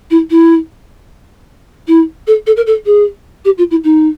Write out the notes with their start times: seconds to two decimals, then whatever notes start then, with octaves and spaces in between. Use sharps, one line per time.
0.11 E4
0.31 E4
1.88 E4
2.27 A4
2.47 A4
2.57 A#4
2.67 A4
2.86 G#4
3.45 G4
3.58 F4
3.71 E4
3.84 D#4